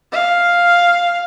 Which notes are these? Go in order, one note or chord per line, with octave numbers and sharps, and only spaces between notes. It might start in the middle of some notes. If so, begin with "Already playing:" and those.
F5